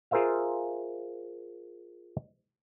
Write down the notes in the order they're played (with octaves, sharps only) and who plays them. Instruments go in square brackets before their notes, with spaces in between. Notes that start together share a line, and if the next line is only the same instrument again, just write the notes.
[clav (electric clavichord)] F4 G#4 A#4 C5 E5 F5